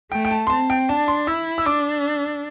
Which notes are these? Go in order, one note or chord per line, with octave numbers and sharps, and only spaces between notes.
A3 G5
G5
A5
C6
C4 A5
G5
D4 A5
C6
E4 E6
E6
D4 D6